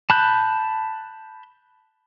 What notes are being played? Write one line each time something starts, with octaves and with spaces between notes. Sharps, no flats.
A5 B5 F#6 G6